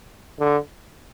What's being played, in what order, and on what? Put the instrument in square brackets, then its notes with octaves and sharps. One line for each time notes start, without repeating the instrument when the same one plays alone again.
[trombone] D3